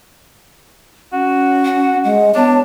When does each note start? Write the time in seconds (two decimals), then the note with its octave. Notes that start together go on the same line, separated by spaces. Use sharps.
1.13 C#4 F#4
1.65 F#5
2.04 G#3 D#5 F#5
2.35 B3 D4 C#5 A5